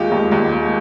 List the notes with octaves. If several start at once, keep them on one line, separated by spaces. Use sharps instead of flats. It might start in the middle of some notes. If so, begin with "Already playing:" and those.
Already playing: D#2 G#3 F4 G4
D#2
D#2
G#3